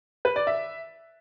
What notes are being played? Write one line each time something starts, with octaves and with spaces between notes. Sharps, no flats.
B4
D5
E5